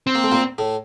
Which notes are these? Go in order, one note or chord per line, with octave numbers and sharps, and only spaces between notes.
C4
A#3
A3
A#2 A#3
A2 A3